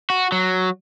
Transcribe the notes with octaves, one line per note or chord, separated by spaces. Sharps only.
F#4
F#3